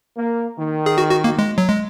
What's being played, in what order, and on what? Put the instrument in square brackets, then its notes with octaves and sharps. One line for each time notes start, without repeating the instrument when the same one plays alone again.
[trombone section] A#3
D#3
[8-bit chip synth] G#4
F#4
F#4
A#3
G#3
F#3
G#3